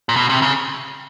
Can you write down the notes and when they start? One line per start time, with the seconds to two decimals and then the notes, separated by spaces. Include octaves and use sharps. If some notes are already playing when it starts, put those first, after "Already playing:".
0.09 A#2
0.16 B2
0.30 C3
0.42 C#3